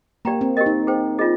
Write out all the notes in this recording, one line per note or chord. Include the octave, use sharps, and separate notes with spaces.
A#3 D4 G4 D5 G5 A#5
C4
G4 A#4 D#5
D#4
G#4 C5 G5
D4 F4 G#4 D#5